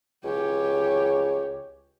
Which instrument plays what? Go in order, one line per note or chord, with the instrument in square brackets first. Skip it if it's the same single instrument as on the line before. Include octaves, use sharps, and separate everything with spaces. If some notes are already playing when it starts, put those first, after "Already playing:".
[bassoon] C#2 [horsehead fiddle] G4 C#5